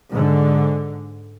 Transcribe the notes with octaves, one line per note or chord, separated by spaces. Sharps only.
G#2 D3